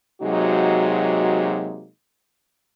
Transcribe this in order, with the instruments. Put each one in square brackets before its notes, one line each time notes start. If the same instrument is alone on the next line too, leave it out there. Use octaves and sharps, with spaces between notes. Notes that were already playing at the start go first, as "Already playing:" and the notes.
[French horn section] C3 F#3 G#3 A#3 D#4 F#4